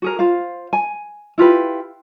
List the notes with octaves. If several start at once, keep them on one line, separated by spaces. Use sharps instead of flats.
F#4 G#4 A#4
F4 C5 F5
G#5
E4 F4 G4 B4